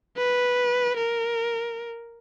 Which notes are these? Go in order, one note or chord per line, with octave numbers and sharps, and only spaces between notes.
B4
A#4